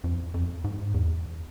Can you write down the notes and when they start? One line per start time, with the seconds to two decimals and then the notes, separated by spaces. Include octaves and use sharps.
0.04 F2
0.34 F2
0.64 G#2
0.94 E2